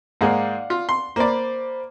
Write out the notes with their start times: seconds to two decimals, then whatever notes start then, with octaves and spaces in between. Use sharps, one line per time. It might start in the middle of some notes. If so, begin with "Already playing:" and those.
0.21 G#2 A#3 G#4 D5 F5 F#5
0.70 F4
0.89 C6
1.16 A#3 C5 D5 B5